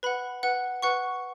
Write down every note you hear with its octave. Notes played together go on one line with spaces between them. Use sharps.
B4 F#5 B5
B4 F#5
B4 F#5 C#6